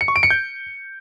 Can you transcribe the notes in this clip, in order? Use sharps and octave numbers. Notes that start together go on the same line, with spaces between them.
C#7
C#6
D7
C#7
G6